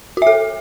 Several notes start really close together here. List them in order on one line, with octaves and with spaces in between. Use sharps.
F#4 E5 A4